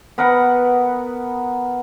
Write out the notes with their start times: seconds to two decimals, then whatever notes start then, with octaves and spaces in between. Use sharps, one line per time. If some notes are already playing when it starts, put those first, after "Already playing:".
0.18 B3 A#4 B4 F#5